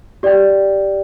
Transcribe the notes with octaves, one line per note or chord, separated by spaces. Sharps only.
G4 D5 G5